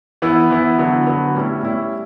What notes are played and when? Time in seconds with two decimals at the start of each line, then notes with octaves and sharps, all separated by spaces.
0.22 E3 B3 E4
0.51 E3 B3 E4
0.78 D3 F#3 B3
1.07 D3 F#3 B3
1.35 A2 G3 C#4 E4
1.63 A2 G3 C#4 E4